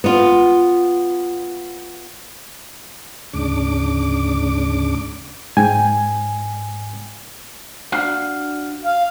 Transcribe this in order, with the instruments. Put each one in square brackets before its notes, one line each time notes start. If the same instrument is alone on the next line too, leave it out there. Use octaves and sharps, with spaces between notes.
[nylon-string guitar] B3 F4
[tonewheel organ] D2 G#2 C#3 D4 D6
[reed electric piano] G#2 G5 G#5
[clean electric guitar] D4 F#4 F5
[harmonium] F5